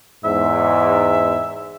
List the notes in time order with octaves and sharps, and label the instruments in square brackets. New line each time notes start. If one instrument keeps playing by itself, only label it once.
[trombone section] E2 G#2 [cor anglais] E5